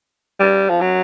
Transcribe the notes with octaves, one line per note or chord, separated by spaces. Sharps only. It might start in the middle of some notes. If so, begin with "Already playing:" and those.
G3
F3
F#3